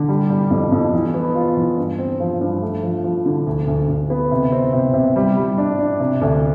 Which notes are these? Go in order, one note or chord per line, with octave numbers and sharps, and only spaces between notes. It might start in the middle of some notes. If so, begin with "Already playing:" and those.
Already playing: D3
G3
G3
F2
F2
E2
B3
F4
E2
G2
C4
F3
G2
A3
F3
F3
D3
D2
D2
D2
B3
C3
C4
C3
C3
G3
G3
D4
D4
C3
D2